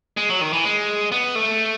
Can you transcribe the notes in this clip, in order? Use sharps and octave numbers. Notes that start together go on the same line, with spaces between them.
G#3
F#3
D#3
E3
G#3
B3
A3